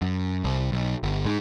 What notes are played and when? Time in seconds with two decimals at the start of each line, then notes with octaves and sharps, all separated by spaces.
0.02 F#2
0.44 C2
0.72 B1
1.03 G1
1.25 G#2